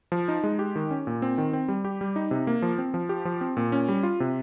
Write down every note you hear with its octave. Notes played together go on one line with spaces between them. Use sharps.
F3
D#4
G#3
G4
D#3
C#4
A#2
C4
D#3
C4
G3
G4
G3
D#4
C3
A#3
F3
C4
F3
G4
F3
C4
A#2
C#4
G3
F4
C3